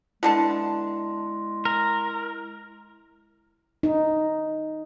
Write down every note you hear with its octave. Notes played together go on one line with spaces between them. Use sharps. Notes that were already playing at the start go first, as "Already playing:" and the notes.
B2 D3 G#3 E4 A5
A#4
D#4